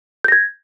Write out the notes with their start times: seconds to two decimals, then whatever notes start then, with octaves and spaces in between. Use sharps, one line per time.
0.24 G6
0.28 A#6
0.32 G#6